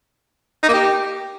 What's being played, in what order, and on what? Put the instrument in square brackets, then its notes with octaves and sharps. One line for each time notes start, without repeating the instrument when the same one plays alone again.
[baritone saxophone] D#4
A#3
G4